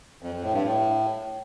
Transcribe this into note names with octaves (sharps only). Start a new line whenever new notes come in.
F2
F2
A2
G2
A2